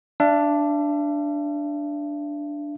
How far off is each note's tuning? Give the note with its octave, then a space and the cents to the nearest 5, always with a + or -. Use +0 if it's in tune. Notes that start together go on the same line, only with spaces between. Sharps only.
D4 +0 E5 +45